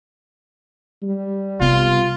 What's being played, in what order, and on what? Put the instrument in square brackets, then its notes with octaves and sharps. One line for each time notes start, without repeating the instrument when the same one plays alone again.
[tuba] G3
[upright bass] C3 B3 [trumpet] F4